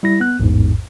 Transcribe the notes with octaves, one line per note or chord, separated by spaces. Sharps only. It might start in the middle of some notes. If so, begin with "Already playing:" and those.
G3 E4 A#6
B3 F#6
A1 E2 G#2